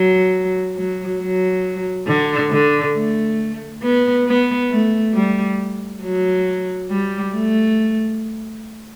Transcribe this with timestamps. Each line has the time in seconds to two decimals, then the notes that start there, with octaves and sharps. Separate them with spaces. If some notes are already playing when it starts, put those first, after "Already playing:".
Already playing: F#3
0.76 F#3
1.20 F#3
2.07 D3
2.51 D3
2.94 A3
3.82 B3
4.27 B3
4.70 A3
5.14 G3
6.03 F#3
6.90 G3
7.34 A3